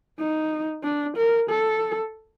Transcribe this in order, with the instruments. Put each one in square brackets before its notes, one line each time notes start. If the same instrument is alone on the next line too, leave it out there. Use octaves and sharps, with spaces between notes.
[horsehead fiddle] D#4
D4
A#4
A4